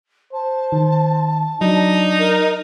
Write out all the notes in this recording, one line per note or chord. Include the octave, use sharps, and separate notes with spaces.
C5 A5
D#3
F#3 D4 D#4
A#4